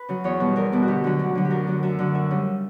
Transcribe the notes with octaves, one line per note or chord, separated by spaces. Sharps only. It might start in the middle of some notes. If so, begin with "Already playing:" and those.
Already playing: B4
C#3 F#3
E2 C#5
B2 G3
E2 A#4
B2 G3
F#4
D2 G4
D3 F#3
D2
D3 F#3
G4
F#2 A#4
D3 F#3
F#2 E5
D3 F#3
D2 E5
C#3 G3